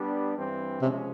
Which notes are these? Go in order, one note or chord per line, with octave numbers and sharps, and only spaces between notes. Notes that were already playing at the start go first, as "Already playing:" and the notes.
Already playing: G3 B3 D4 G4
G2 E3 G3 C4
C3 F3 G#3 C#4